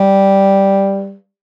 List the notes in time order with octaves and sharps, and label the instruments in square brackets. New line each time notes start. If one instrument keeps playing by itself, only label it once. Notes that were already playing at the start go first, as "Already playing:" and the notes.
Already playing: [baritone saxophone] G3